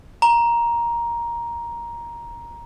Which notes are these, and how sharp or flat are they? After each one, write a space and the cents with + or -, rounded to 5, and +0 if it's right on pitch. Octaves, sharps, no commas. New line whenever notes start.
A#5 +10